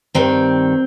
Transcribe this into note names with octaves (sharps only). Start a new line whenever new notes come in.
G2 D#3 C4